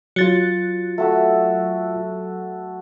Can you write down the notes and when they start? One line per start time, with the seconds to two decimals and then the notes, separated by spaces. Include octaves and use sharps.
0.16 F#3 F4 A6 C#7
0.98 A3 F#4 A4